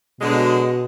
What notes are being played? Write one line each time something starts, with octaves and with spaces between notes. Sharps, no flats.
B2 D3 F#3 G#3